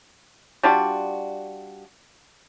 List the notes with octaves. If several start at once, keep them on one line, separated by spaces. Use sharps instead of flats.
G3 D4 F4 F#4